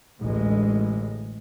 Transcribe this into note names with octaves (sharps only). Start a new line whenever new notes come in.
A1 D2 G#3